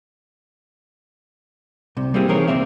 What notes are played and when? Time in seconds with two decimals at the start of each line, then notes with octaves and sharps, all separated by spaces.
1.97 C2 C3
2.14 G3 A#3 C4 E4 G4 G#4
2.28 E3 D#4 G#4 A#4 C5 C#5
2.48 C2 C#3 A#3 C4 E5 F5